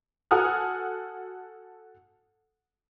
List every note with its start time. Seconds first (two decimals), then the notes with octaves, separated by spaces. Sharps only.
0.31 F#4 A4 F#5 G#5 D#6 F6